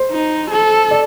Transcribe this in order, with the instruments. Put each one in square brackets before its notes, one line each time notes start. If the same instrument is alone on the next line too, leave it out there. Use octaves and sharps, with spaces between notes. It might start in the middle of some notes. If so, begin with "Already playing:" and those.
Already playing: [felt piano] C5
[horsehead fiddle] D#4
A4
[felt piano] D5